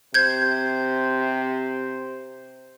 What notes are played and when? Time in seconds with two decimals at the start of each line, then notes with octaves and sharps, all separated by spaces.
0.14 C3 C5 G6 G#6